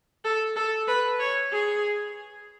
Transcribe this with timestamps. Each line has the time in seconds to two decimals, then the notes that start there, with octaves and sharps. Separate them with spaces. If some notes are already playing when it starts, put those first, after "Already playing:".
0.24 A4
0.56 A4
0.87 B4
1.20 C#5
1.52 G#4